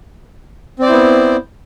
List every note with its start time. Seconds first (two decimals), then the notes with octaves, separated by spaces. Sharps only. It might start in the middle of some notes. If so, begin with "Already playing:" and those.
0.79 C4
0.82 D5
0.85 C5
0.89 E4
0.92 B3